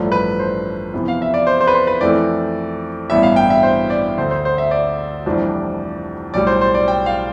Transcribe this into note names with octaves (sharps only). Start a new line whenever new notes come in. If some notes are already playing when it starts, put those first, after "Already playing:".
Already playing: A1 G2 F3 A3 D4
B4
C5
F2 C3 E3 B3
F5
E5
D5
C5
C5
B4
C5
B4
F2 E3 A3 C4 D5
A1 G2 E3 B3 D4 E5
F5
G5
E5
C5
D5
D2 D3 A3 C5
C5
C5
E5
D5
F1 F2 E3 G3 D4
B1 A2 G3 D5
C5
C5
D5
G5
F5